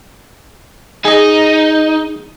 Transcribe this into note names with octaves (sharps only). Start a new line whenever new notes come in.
D#4 G#4 D#5